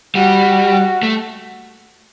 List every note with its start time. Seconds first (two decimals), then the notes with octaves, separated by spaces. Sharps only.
0.15 G3 F#4
1.03 A3